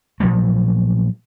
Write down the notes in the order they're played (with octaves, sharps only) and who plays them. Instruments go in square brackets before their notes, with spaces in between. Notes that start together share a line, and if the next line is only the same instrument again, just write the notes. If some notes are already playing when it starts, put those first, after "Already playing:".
[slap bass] A#2 F3 F#3 A3